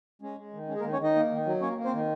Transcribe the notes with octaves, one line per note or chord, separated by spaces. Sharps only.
G#3 C#4
G#3
D#3
G#3 C#4
G#4
A#3 A#4
D#3
C#4 C#5
D#3 D#4 D#5
A#3
D#3
F#3
A#3 C#4 C#5
A#3
C4 C5
D#3